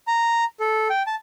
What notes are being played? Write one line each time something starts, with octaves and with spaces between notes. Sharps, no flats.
A#5
A4
G5
A5